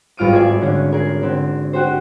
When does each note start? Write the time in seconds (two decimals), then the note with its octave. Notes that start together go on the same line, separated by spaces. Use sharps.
0.17 G#1 G2 F4 F6 D7 D#7
0.32 G#4 D5 E5 G#5
0.61 D3 C#4 D4
0.92 G#4 A#4
1.23 D3 C4
1.73 D4 F#4 G4 C5